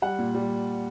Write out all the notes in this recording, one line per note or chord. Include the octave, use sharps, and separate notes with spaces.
G3 F#5
A#2
G3